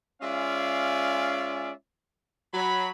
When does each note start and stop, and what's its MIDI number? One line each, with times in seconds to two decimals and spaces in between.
0.22 1.72 56
0.22 1.72 61
0.22 1.72 65
0.22 1.72 74
0.22 1.72 76
0.22 1.72 77
2.54 2.90 54
2.54 2.90 83